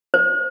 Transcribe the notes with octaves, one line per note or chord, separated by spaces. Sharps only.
C5